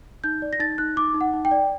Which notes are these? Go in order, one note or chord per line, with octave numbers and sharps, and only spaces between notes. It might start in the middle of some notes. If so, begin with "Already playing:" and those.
D#4 G6
D5
A#6
D#4 A6
D#4 F#6
D#4 D6
D#4
F#5
D#4
G5
D5